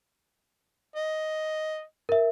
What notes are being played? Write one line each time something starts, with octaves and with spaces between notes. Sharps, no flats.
D#5
A#4 E5